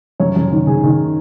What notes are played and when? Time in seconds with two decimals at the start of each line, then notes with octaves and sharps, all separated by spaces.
0.20 F#2 C#5
0.36 F#2
0.52 D#3
0.67 D#3 G#4
0.83 D#3